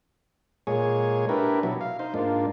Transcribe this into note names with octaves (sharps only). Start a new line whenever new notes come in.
A#2 G#3 G#4 C#5
D4 E4 G4 A#4 B4
B2 F#3 E4
F5
D#4 C5
G#2 A#3 D4 F4